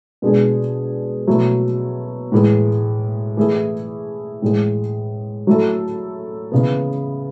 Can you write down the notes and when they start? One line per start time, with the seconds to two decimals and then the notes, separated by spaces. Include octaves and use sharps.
0.22 B2 G#3 D4 G#4
1.28 B2 F#3 A3 E4
2.32 A2 E3 G#3
3.37 E3 A3 E4 G#4
4.42 A2 E3 G#3
5.47 F#3 A3 E4 A4
6.52 C#3 E3 B3